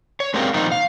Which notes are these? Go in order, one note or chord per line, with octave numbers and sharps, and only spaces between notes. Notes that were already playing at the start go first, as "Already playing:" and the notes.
C#5
G#3 C4 D4 G4 A#4 F5
A#2 D#3 F3 C4 D#4
F5